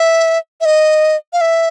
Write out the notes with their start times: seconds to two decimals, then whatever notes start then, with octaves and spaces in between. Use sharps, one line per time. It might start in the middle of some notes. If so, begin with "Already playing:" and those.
Already playing: E5
0.61 E5
0.65 D#5
1.33 F5
1.41 E5